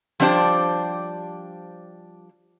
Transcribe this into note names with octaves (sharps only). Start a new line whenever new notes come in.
F3 G3 D4 G4 C5 A5